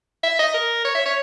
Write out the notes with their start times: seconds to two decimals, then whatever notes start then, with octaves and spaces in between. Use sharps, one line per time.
0.23 E5
0.39 D#5
0.54 A#4
0.84 C#5
0.95 E5
1.05 C#5